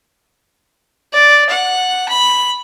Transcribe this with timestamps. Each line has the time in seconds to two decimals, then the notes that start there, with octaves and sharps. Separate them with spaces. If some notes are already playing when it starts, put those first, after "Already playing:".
1.13 D5
1.50 F#5
2.08 B5